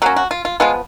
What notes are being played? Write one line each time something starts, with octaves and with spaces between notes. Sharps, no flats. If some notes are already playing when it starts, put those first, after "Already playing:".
F#3 A#3 C#4 F#4
F#4
F4
F4
F3 G#3 B3 F4